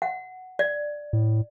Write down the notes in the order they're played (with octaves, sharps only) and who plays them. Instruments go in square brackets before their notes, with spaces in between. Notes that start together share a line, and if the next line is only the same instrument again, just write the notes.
[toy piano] F#5
D5
[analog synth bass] A2